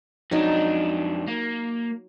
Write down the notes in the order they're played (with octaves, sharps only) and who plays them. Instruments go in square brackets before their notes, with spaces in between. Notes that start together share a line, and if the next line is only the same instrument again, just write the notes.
[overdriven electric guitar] F2 D4 [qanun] F#3 D#4
[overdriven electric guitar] A#3